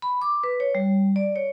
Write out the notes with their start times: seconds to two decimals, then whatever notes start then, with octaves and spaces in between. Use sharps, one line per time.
0.02 B5
0.22 D6
0.44 B4
0.60 C#5
0.75 G3
1.16 D5
1.36 C#5